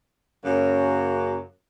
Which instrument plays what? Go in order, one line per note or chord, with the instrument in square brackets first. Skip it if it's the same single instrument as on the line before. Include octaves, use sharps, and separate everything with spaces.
[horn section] F#2 C#3 F#3 A#3